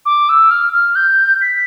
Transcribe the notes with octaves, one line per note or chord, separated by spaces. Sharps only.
D6
E6
F6
F6
G6
B6